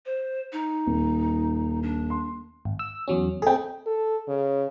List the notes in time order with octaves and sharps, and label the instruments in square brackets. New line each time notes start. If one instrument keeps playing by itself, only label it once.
[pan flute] C5
D#4
[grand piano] D#1
[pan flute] D4
[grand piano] C6
[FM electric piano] G#1
E6
E2 F#3 C#4
[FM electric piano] C4 G#4 [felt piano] A4 G5
[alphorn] A4
C#3